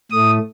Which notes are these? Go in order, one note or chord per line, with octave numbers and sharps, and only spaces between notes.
A2 A3 D#6